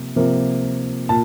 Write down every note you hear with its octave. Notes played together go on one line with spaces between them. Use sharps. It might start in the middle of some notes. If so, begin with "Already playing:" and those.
Already playing: C3 F3 A#3
C3 F3 A#3
A#2 A5